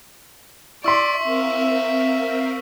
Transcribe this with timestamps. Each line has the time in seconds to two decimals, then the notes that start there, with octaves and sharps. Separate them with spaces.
0.84 E4 D5 C6 C#6 E6 B6
1.23 C4 A#4 E5 F5